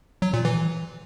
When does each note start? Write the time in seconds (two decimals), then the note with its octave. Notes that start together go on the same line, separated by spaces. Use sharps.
0.22 F#3
0.33 A#2
0.45 E3